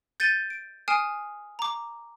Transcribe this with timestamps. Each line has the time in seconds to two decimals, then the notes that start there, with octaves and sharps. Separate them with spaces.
0.20 G6 A6 C#7 D#7 G7
0.50 D7
0.88 G#5 D#6 F6 C7 D7 E7
1.59 A#5 D6